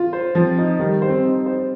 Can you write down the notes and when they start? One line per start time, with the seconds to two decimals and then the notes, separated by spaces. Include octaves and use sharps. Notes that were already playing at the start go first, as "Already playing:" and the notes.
Already playing: F4
0.13 C5
0.35 F3 C4
0.58 D#4
0.79 D#3 G3
1.02 C5
1.09 C4
1.24 D#4
1.46 C5